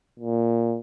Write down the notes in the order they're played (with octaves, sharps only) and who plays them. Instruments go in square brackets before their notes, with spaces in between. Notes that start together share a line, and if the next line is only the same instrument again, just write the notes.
[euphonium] A#2